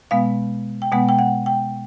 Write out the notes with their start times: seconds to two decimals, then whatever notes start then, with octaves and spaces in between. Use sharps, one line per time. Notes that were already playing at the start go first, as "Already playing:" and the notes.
0.11 B2 G#3 B3 F5
0.82 G5
0.92 B2 G#3 B3 F#5
1.09 G5
1.19 F#5
1.46 G5